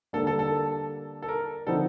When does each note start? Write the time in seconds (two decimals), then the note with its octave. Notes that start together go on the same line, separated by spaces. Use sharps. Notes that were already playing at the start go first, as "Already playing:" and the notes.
0.13 D3 G3 A#3 D4 A4
0.27 A4
0.39 A4
1.22 A4
1.28 A#4
1.67 D3 F3 C4 D#4 A4